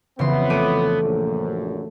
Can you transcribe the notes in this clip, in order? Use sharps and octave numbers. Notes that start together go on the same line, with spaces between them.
F2 C#3 E3 B3 C6
A3 D6 D#7
A#1 F#2